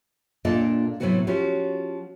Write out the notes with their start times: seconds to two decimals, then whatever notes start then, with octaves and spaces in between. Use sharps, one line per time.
0.45 A#2 A#3 D4 F4 A4 D#5
1.00 A2 C3 E3 F#3 B3 F#4
1.27 F3 C#4 F#4 G4